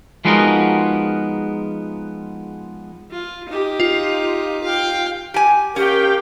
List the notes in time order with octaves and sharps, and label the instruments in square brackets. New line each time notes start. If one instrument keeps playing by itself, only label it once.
[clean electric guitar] F3 G#3 B3 D#4 F#4 A#4
[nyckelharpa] F4
D#4 G4
[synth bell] F4
[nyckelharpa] F5 G5
[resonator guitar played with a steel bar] G4 G#5
[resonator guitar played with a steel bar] C#4 [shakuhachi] G4 [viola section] A#4 F5 G5